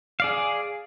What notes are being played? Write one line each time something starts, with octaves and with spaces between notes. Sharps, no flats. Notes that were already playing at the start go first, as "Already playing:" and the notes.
G#4 D5 F5